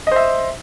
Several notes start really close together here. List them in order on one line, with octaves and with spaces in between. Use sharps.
D#5 C5 E5